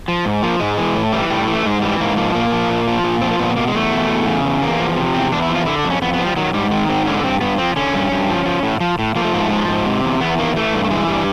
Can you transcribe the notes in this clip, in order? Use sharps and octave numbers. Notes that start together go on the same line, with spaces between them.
F3
G#2
F3 A#3
G#2 G#3
E3
A2
E3 G3
A2 G3
E3
A3
G#2 G#3
E3 G3
G#2 A#3
F3 A#3
B3
A#2 A#3
F3
A#2
F3
A#2
F3 C4
A#3
A#2 B3
B3
B2 A#3
G#3
E2 A3
B2
E2
C#3
E2
E2 A#3
F3
C3
E2 C4
E2 D4
E4
F3
F4
D3 E4
D4
F2
C#4
F2 B3
B3
F3
G3
D#3 F#3
G#2 G3
D#3 G#3
G#2 C4
D3 C#4
B3
G2 C4
G2 B3
F3 C4
D3 C#4
G2
G2
F3
F3
A2
F3
A2
F3 A#3
A3
G#2 A#3
A3
F3 G#3
G#2
C3
E2
E2 B3
D#3 A#3
E3 A3
G2
A3
E3 G#3
G2 G3